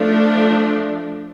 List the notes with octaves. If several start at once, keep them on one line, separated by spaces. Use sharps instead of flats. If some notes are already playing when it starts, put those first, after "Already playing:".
Already playing: F3 A3 D4